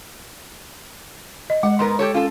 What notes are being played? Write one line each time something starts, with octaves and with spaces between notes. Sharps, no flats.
D#5
G#3 F#5
G#2 B3 A#4 C6
G4 A4 C#5
C#4 F4 A4